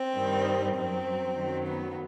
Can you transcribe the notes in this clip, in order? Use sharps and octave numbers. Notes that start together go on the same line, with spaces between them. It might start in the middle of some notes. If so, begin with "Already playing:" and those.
Already playing: C4
G2 D#3 G3
F#2 F#3 C4
F#2 D#3 F#3
B3